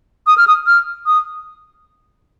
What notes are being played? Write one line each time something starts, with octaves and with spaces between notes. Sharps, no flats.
D#6
F6
D#6
F6
D#6